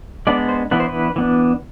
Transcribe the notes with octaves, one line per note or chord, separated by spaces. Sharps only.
G#3 B3 D4 D5
C5
E3 B3 D4 B4
C5
B4
E3 B3 D4